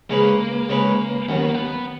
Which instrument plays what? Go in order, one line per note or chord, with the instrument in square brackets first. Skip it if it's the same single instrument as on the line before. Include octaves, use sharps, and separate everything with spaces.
[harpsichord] C#3 G#3 C#4 G#4 B4 [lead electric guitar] A#3
[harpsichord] C#3 G#3 C#4 G#4 B4
[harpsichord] D#2 D#3 F#3 [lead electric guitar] C#4
[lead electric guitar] B3
A#3
B3